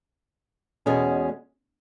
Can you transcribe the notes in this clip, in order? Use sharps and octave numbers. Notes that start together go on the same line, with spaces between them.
E2 B2 G#3 C#4